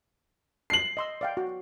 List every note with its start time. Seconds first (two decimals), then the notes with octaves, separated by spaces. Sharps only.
0.70 C7 F#7
0.97 D#5 C6 E6
1.21 D5 F5 G5
1.37 F#4